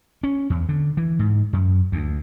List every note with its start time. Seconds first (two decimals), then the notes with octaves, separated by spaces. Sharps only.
0.23 C#4
0.50 E2
0.69 D3
0.97 E3
1.19 G#2
1.53 F#2
1.92 D2